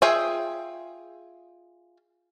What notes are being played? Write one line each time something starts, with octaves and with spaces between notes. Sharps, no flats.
F4 G#4 E5 G5 G#5